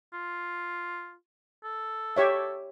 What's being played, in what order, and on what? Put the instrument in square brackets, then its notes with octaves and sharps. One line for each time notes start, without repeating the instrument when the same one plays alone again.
[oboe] F4
A4
[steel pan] G4 C#5 E5